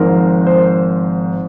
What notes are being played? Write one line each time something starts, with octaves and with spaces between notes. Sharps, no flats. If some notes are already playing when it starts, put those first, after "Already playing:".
Already playing: G#1 G#2 F3 A#4
C5